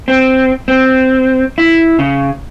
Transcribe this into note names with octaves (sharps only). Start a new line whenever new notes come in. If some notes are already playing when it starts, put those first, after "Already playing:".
C4
C4
E4
C#3